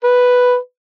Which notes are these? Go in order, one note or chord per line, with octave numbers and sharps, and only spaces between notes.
B4